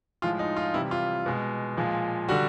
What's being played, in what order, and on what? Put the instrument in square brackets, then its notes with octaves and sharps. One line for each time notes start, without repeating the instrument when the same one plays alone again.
[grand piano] A2 F3 G#3 F4
D#4
F4
C3 E3 G3 E4
F4
B2 G#3
A#2 F3 G#3
D3 G3 F#4